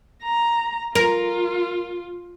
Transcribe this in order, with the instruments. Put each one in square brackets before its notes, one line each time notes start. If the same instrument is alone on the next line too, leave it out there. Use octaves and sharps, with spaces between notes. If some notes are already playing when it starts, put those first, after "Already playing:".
[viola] A#5
[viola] F4 [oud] A#4